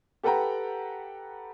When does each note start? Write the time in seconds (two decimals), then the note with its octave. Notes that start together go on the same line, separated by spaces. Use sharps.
0.23 G4 A4 B4 F#5 G5 A#5